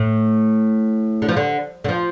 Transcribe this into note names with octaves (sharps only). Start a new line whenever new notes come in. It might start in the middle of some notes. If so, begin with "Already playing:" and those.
Already playing: A2
D3
F3
D3
D3
F3